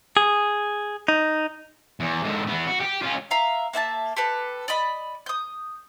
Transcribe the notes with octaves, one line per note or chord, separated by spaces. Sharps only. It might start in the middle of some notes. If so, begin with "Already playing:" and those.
G#4
D#4
E2
G#2 D3
E3 B3
F#4
G4
C#4 F4
E5 F5 A#5
A#3 E5 G5 A5
G4 A4 B4
D5 D#5 B5
D#6 G6